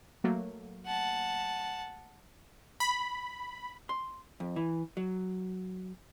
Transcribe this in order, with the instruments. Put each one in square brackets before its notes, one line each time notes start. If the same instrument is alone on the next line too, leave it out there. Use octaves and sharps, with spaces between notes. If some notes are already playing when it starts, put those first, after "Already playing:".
[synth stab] F#3 A3 A#3
[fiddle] F#5 A5
[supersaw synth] B5
[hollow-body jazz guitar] C6
F2
E3
F#3